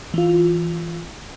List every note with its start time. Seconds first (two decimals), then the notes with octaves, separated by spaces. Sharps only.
0.14 E3 F4